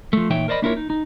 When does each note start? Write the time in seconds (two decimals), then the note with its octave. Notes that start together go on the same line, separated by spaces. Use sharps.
0.13 F3 A3
0.30 A#2 E3 D#4 C#5 E5 G5
0.48 A#4 C5 D5 D#5 B5
0.62 A#3 D4 E4 F4 A#4 C#5
0.77 D#4
0.90 D#4